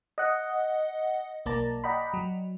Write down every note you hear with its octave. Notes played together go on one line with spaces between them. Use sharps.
D#5 F#5
B1 A#3 D5 A5 A#5
D5 D#5 F#5 G5 A#5 B5
F#3